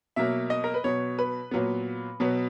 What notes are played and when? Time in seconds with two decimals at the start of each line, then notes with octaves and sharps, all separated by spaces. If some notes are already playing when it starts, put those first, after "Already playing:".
0.16 B2 F#3 A#3 E5
0.50 D#5
0.64 A#4
0.74 B4
0.84 B2 F#3 B3 C#5
1.19 B4
1.51 A#2 F#3 B3
2.20 B2 F#3 B3